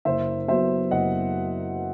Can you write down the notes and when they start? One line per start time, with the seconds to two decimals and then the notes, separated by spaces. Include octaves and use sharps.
0.05 F#1 C5 E5
0.48 F#2 F#3 B3 C5 E5
0.91 F#1 D#5 F#5